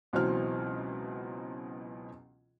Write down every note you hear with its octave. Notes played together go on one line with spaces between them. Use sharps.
C#2 B2 E3 F#3 C4 F6